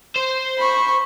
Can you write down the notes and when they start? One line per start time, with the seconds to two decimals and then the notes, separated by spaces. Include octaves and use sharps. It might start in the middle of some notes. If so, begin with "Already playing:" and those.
0.16 C5
0.58 B5 C#6